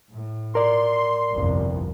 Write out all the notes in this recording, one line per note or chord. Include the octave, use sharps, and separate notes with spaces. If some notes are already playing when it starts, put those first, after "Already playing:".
A2
A#4 D5 C6
G1 C2 F2